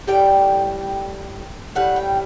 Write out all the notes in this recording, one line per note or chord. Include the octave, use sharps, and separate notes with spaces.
A2 G3 G5
A2 G3 F#5
G5